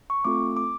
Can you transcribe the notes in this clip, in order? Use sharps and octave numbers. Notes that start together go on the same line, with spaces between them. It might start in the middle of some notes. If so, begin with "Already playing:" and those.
C#6
A3 C4 F4 A4 D6
D6